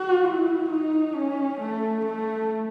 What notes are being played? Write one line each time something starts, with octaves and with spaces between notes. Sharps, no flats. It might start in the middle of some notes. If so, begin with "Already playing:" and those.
Already playing: F#4
E4
D#4
C#4
A3
A3